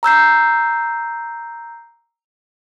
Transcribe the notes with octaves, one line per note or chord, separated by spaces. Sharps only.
A#5 E6 G6 C7